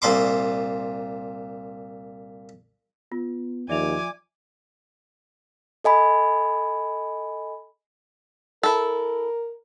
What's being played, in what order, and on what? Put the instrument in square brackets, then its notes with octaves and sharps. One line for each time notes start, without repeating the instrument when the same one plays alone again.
[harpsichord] C2 A#2 D5 C6 D6
[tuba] B3 [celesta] F4
[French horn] D#2 [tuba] F3 [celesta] D5 E5 F7 [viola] G#5 D6
[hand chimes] A4 D#5 G#5 B5
[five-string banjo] E4 A4 [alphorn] A#4